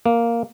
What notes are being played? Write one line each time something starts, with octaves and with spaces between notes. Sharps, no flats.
A#3